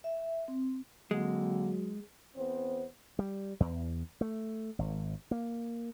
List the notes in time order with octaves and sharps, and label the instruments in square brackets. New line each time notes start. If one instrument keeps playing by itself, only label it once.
[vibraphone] E5
C4
[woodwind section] D3 A#3 C4 [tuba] F#3 [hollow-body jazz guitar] G#3
[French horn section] E2 B3 C4 C5
[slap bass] G3
E2
A3
G#1
A#3